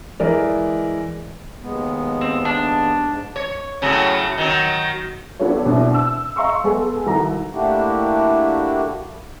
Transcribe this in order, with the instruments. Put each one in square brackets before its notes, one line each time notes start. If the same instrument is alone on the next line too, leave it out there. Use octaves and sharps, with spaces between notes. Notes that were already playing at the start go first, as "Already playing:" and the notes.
[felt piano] E3 G#3 A#4 D5
[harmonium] D#2 G#3 B3
[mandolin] C4
D4
[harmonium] G#2
[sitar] C#5
A2 C#3 F#3
D#3 F#3
[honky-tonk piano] B3 D4 F4 G4 A4 C#5
B2 C4 D4 E4
E6
D#5 F5 A#5 C6 C#6 E6
G#3 B3 G#4 A4
C2 D#3 F#4 A4 A#5
[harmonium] A3 A#3 D4 E4 F#4 G4